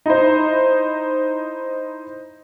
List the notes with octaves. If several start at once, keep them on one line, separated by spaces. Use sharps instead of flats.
D#4 E4 C5